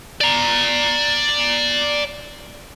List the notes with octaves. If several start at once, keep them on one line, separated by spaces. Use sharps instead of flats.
D5 A#5